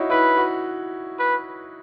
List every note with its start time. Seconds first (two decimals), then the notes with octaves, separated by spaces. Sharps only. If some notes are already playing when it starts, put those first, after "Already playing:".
Already playing: D#4 E4 F#4 C#5
0.10 E4 B4
0.37 F#4
1.19 B4